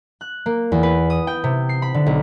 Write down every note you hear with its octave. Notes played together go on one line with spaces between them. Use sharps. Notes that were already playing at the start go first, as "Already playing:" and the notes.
F#6
A#3
E2
B4
D#6
G5
C3
C7
B5
D3
B1